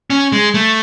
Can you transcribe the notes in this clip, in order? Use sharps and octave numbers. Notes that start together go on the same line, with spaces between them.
C#4
G#3
A3